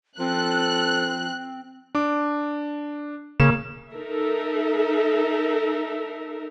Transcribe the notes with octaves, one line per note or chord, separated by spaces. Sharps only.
F3 C4 A4 F#6
D4 D6
C#3 A#3 E7
D#4 A4 A#4 E5